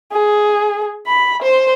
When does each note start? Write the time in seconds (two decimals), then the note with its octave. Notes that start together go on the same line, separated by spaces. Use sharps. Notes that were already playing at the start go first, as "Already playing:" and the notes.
0.12 G#4
1.07 B5
1.43 C5